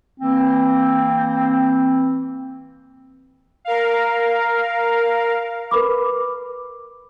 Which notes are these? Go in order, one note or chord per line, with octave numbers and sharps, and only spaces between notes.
E3 A#3 C4
A#4 F5
A#4 B4 B5 D6